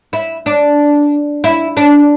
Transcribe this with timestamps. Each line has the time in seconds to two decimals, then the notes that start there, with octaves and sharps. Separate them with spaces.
0.13 E4
0.46 D4
1.44 E4
1.77 D4